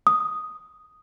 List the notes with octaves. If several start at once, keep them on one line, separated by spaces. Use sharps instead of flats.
D#6